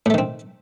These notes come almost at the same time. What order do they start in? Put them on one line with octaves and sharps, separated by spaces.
A2 A3 D#3 C4